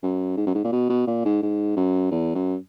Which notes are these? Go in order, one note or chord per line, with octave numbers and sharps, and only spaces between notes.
F#2
G#2
F#2
G#2
A#2
B2
B2
A#2
G#2
G#2
F#2
E2
F#2